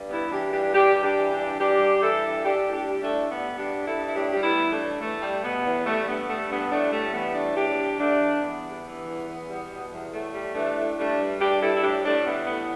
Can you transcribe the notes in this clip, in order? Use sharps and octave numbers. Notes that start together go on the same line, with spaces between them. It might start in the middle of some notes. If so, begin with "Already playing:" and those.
Already playing: G2
G3 B3 E4
E3 D4 G4
G2 D4 G4
G2 D4 G4
G3
D4 G4
E3
D4 G4
G2
G2 D4 G4
G3
E3 E4 A4
G2
G3 D4 G4
A2
D4 G4
G3
A3 D4
A2
G3 B3
G2
D4 G4
G3
E4 A4
G2
E4
A2 D4 G4
G3 G4
B3 E4
E3
A3 D4
A2
E2 A3
G3
B2 B3
E2
G3 A3
G2 B3
G3 A3
G2 B3
A2 A3 D4
G3 A3
E3 B3
A2 A3 D4
E2 D4 G4
G3
D3 A3 D4
E2
E2 B3
G3
E3
E2
E2
G3
B2
E2
A2 A3
G3
E3 A3 D4
A2
G3 A3 D4
G2
G3 D4 G4
G2 E4 A4
E4
A2 D4 G4
G3 A3 D4
E3 B3
A2 B3